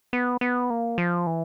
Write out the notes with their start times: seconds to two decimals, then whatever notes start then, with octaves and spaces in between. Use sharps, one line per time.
0.13 B3
0.41 B3
0.70 A#3
0.98 F3
1.27 E3